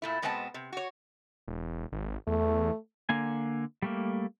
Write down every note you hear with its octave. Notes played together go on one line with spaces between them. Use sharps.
A#2 A3 E4
B2 G#3 B3 C4 F#5 A5
C3
F#4 C#5
E1
G#1
E2 A3
D3 A#3 G#5
G3 A3 A#3